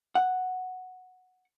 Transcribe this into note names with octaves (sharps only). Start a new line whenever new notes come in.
F#5